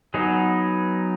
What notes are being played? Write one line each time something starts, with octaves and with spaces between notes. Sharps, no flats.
F#3 B3 D#4 G#4